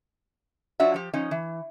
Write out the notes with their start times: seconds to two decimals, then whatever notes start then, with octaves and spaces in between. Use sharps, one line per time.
0.80 F#3 D4 F4 F#4 D5 E5
0.94 F3 G4
1.14 F3 C#4 D#4
1.31 E3